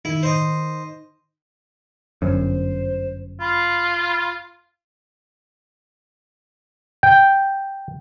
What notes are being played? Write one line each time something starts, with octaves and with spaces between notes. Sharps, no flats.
D#3 E4
C5 D#5
G1 F#2 C5
F4 B5
G5